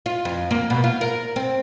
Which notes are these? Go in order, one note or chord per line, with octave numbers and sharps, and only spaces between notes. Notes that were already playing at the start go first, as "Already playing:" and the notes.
F4
F2
A#3
B2
F4
A#4
C4